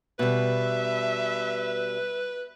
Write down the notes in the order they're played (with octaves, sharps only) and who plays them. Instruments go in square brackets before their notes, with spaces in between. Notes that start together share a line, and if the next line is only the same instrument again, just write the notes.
[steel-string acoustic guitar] B2 G3 [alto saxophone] B4 [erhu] E5